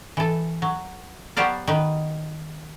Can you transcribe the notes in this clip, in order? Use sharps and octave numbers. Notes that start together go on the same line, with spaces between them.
E3 A4
F#3
F#3 B3 G4 C5 D5 F5
D#3 B4